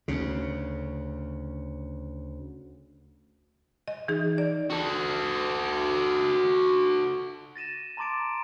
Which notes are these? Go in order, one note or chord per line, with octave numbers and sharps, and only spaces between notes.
D2 C#3
D#5
E3 D#4 G#4
D5
F#4 A4
A6 A#6 D#7 E7
A5 A#5 C6 D6 A6 D7